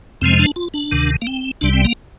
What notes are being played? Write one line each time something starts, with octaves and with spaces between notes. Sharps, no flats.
F2 C3 F3 G#3 C4
D4
F4
D4
D2 C3 D#3
A#3
C4
C2 C3 G3 D4
C4
A#3